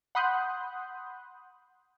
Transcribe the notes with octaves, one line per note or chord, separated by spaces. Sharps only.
F#5 B5 C6 D#6 F#6 G6